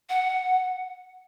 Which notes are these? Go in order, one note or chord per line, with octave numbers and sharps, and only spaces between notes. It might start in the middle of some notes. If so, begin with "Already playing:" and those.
F#5